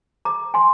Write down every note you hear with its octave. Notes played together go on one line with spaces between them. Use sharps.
A#5 D6
G#5 C6